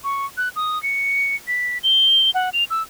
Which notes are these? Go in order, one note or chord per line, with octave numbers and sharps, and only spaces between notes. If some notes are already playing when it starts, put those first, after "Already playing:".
C#6
F#6
D#6
C#7
B6
G7
F#5
F7
E6